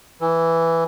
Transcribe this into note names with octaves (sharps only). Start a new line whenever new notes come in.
E3